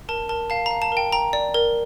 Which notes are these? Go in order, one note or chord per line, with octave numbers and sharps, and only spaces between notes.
A#4 A5
A#4 A5
F5 A5
A#5
F5
A5
A#4 G5
G5 A#5
D5
A#4